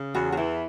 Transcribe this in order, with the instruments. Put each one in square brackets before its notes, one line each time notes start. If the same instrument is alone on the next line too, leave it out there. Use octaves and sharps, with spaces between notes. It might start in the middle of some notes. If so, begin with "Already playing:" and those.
Already playing: [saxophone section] C#3
[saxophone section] E2 [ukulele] F#4
[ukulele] F#4
[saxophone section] E3 [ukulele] E4